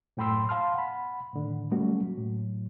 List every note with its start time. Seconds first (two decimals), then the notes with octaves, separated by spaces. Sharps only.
0.17 F#2 A2 G5 B5 C6 E6
0.49 F5 A5 C6 F6
0.74 F#5 B5
1.33 A2 D3 D#3
1.71 F#3 G3 A3 A#3 C#4 F#4
2.17 A2 F#3